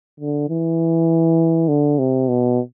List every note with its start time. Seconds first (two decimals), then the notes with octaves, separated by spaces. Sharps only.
0.20 D3
0.49 E3
1.69 D3
1.99 C3
2.29 B2